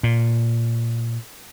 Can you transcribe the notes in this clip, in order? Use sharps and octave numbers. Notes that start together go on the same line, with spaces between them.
A#2